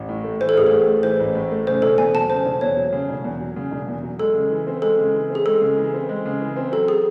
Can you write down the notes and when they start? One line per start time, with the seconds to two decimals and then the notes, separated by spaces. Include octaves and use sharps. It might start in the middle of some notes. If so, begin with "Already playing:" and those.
Already playing: A1
0.09 A2
0.24 A3
0.40 E3 C5
0.49 A4
0.55 A1 G#4
0.67 A4
0.72 A2
0.87 A3
1.03 E3 C5
1.20 A1
1.35 A2
1.51 A3
1.67 C#3 C5
1.82 E1 A4
1.98 E2 G#5
2.14 F#3 A5
2.30 C#3 C5
2.45 E1
2.61 E2 C#5
2.77 F#3
2.92 C#3
3.09 E1
3.24 E2
3.41 F#3
3.56 C#3
3.71 E1
3.88 E2
4.03 F#3
4.19 G#3 A4
4.35 C#3
4.51 E3
4.67 C4
4.82 G#3 A4
4.99 C#3
5.14 E3
5.30 C4
5.35 G#4
5.46 G#3 A4
5.61 C#3
5.77 E3
5.94 C4
6.09 G#3
6.26 C#3
6.41 E3
6.56 C4
6.72 F#3 A4
6.88 G#4